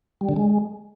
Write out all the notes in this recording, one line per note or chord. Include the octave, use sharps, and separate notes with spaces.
G3
D3
G#3